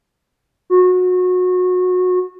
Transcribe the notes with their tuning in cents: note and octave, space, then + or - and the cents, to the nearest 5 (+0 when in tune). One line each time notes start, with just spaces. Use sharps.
F#4 -25